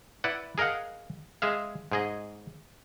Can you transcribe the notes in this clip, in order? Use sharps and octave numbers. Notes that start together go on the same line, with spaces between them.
E4 B4 D5 F#5
G#4 A#4 D#5 F5 F#5
G#3 G#4 E5 F5
G#2 G#4 D#5